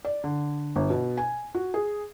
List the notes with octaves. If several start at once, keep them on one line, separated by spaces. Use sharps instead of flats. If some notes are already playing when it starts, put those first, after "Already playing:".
D5
D3
G1
B2
G#5
F#4
G#4